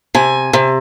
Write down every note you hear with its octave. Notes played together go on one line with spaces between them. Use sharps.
C3 G#5
C3